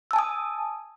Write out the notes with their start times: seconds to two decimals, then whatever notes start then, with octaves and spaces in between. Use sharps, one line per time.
0.11 E6
0.13 A5
0.16 G#5
0.19 D#6